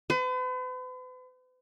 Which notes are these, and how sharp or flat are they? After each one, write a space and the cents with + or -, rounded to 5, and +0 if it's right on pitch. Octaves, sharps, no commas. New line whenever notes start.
B4 +45